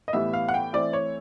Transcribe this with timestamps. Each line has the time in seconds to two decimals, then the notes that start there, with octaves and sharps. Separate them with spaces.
0.08 D#5
0.13 A2 E3 G3 B3 E5
0.33 F5
0.49 F#5
0.54 G5
0.73 E3 A3 C4 D5
0.93 C#5